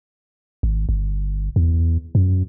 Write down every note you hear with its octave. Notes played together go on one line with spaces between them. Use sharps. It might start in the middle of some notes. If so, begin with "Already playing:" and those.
G#1
G1
E2
F#2